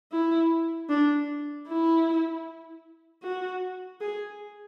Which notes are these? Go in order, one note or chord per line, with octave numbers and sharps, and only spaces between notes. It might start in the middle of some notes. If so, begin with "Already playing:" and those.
E4
D4
E4
F#4
G#4